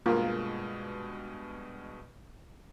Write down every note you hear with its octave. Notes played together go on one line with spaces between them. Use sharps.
G2 B2 G#3 A#3 F4